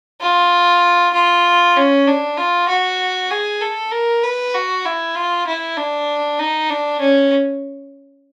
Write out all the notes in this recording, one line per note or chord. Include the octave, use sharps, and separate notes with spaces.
F4
F4
C#4
D4
F4
F#4
G#4
A4
A#4
B4
F#4
E4
F4
E4
D4
D#4
D4
C#4